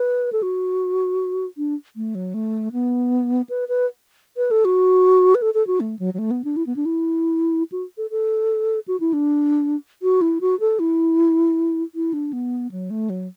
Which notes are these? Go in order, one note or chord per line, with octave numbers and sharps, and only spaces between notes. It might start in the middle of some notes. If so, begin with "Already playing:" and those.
Already playing: B4
A4
F#4
D4
A3
F#3
A3
B3
B4
B4
B4
A4
F#4
B4
A4
A4
F#4
A3
F#3
F#3
A3
B3
D4
E4
B3
D4
E4
F#4
A4
A4
F#4
E4
D4
F#4
E4
F#4
A4
E4
E4
D4
B3
F#3
A3
F#3